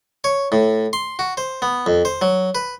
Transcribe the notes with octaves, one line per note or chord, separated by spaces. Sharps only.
C#5
A2
C6
F#4
C5
B3
F2
C5
F#3
B4